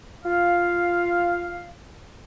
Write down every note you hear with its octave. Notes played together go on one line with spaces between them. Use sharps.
F4 F5